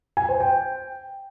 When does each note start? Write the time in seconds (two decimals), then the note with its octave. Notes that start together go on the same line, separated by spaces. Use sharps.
0.17 G#5
0.29 C5
0.40 G5